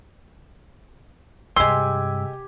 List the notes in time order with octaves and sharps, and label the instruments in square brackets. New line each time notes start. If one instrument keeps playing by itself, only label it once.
[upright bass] G2 C3 [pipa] G#3 C6 [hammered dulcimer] G4 G#5 [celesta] E6